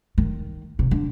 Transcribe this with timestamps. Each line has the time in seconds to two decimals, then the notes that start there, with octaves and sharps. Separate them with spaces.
0.18 D#3
0.79 C3
0.91 D3